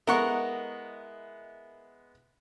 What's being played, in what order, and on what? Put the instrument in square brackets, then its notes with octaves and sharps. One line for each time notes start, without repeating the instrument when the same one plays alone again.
[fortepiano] G#3 B3 E4 [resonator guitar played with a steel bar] A#4 [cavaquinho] D#5 F#5 C#6